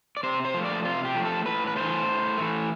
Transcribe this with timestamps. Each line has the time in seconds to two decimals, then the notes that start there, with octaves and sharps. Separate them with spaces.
0.17 D5
0.23 C3 C5
0.45 C5
0.54 F3 A3
0.65 D5
0.85 C3 F4
1.05 G4
1.15 F3 A3
1.25 A4
1.46 A2 B4
1.67 B4
1.76 E3 A3 C5
2.07 A2
2.38 E3 A3